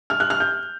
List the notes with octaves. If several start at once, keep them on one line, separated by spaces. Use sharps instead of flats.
F6
F#6
F6
G6